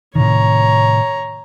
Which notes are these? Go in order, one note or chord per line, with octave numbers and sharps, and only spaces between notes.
A2 C3 D#3 C#5 A#5